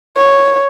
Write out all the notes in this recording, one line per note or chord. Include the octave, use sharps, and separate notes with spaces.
C#5